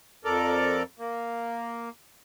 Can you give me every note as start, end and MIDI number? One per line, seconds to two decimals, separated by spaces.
0.25 0.83 41
0.25 0.83 69
0.25 0.83 70
0.25 0.83 74
0.99 1.89 58